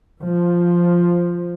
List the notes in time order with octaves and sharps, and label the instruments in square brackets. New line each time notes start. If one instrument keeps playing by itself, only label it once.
[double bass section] F3